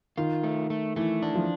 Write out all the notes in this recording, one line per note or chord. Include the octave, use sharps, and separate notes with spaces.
D#3 F4
A3
A3
E3 A3
D4
F3